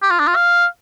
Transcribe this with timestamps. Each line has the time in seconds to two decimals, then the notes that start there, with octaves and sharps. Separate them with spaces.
0.03 G4
0.10 F4
0.19 D4
0.27 F4
0.36 F5